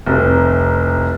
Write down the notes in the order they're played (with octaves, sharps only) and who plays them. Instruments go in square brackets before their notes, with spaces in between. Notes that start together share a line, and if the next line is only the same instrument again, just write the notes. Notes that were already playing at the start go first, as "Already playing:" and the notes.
[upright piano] F1 C2